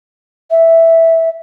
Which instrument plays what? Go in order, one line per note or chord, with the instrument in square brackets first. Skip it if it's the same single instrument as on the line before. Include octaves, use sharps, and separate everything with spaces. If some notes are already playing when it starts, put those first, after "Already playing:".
[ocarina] E5